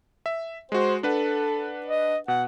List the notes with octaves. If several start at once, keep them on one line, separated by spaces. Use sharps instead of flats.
E5
G#3 F#4 C5
D4 A4 B4 F#5
D#5
B2 F#5